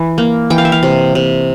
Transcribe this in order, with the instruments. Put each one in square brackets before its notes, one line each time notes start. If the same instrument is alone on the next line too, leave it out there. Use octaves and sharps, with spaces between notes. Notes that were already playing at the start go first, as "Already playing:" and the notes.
Already playing: [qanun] E3
A#3
E3 G5
F5
E5
F5
C3
C3